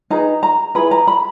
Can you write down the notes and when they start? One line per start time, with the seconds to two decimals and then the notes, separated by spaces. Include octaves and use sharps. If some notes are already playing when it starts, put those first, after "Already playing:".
0.10 D#4 G#4 B4 A#5
0.43 A#5
0.75 E4 G#4 B4 B5
0.91 A#5
1.07 B5